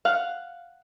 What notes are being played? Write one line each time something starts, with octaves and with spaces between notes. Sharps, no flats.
F5 F#5